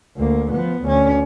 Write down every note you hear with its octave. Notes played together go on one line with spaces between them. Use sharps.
D2 A#3
F3 B3
D2 C#4